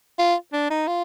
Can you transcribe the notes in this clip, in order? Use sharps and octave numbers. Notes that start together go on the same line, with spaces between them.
F4
D4
D#4
F4